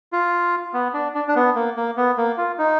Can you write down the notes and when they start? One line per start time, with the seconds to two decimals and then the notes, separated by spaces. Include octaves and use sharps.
0.12 F4
0.74 B3
0.94 D4
1.14 D4
1.28 D4
1.36 B3
1.55 A#3
1.76 A#3
1.97 B3
2.18 A#3
2.38 F4
2.58 D#4